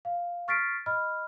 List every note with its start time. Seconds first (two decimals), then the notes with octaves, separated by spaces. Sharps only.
0.05 F5
0.48 C#6 F6 A6 B6 C7 D7
0.86 D#5 B5 F6